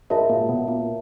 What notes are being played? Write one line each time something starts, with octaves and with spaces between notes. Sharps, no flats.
G#2 G#3 F#4 A#4 C#5 E5 A5
A#2 A#3
B2 B3
A#2 A#3